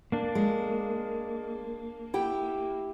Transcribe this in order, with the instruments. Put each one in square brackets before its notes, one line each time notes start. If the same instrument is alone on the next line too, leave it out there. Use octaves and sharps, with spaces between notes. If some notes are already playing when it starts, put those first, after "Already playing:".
[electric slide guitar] A#3 D4
[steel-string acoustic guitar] G#3
E4 G4 G5